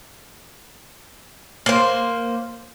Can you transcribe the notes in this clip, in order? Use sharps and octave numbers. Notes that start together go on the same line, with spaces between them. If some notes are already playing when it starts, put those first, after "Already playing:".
A#3 C5